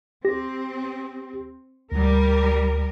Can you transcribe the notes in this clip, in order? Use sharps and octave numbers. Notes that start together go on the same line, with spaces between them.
C4 G4 A#6
D2 G3 A#4